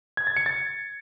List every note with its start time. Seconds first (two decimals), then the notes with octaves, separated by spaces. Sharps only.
0.17 G#6
0.27 A6
0.36 C#7
0.46 A6